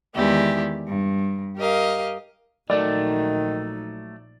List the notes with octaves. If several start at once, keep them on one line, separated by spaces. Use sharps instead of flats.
E2 D#3 G#3 E4 G4 D5
G2
G4 A#4 D#5 F5
A#1 D#3 F#3 A3 D#4 D5